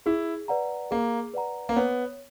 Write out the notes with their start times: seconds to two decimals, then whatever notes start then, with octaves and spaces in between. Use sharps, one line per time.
0.06 E4 G#4
0.48 B4 D5 F#5 A#5
0.91 A#3 G#4
1.34 B4 D5 F#5 A#5
1.69 A#3
1.76 B3 C#5